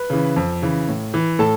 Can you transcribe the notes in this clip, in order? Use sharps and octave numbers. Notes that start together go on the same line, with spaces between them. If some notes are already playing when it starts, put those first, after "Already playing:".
Already playing: B4 B5
C#3 E3
F2
C#3 E3
A2
E3
A2 A4 A5